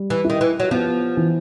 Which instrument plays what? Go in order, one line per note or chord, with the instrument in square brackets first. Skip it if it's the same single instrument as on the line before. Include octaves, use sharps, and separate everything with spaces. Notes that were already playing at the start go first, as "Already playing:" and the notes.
Already playing: [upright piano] G3
[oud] E3
[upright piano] E4
[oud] D#3
E3
F#3
[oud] F3 [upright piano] B3
[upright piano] E3